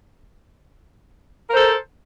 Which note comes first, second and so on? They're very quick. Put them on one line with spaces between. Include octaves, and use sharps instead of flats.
A#4 C5 A4